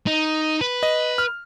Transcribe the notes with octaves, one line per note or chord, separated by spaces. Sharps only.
D#4
B4
D#5
F6